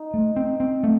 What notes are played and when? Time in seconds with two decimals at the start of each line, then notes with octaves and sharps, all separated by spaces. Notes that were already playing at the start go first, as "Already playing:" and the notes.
Already playing: D#4
0.14 A3
0.36 C4
0.60 C4
0.83 A3